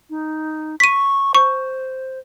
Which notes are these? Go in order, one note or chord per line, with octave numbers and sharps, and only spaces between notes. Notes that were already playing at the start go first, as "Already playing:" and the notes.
D#4
C#6 B6 D#7
C5 C#6